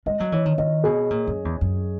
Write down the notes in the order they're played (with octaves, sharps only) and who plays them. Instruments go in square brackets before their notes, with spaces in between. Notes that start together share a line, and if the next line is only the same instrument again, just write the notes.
[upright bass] G#3 [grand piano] D#5
[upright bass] F#3
[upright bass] E3 [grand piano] C#5
[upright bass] D#3
[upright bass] D#3 [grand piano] D#5
[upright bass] B2 [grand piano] G#4
[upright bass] A#2
F#2
E2
F#2